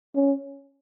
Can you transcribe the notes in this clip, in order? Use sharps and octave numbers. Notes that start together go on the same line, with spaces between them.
C#4